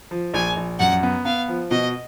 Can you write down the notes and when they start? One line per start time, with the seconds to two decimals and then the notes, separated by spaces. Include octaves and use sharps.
0.11 F3
0.34 A#1 G#5
0.57 A#1
0.79 F#2 F#5
1.03 B3
1.25 B3 F5
1.48 F3
1.71 B2 D#5